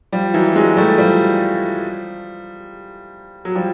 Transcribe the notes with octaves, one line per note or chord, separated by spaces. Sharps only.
F3 G3
E3 F#3
F#3 G#3
G3 A3
F3 G3
F#3
F3 G3